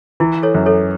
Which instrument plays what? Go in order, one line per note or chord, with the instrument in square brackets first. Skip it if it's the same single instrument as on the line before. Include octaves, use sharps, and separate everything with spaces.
[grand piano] E3 [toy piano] E4
[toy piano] A4 C#5
[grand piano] F#2
[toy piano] A4 C#5